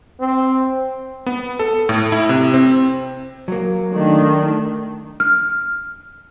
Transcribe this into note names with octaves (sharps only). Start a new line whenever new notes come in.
C4
B3
A4
A2
E4
C3
C4
F#3 A#3
D#3 A3 D4
F6